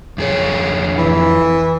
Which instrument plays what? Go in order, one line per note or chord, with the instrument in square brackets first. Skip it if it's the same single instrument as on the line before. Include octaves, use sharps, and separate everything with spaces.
[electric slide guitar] F2 G#4 C#5
[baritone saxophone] E3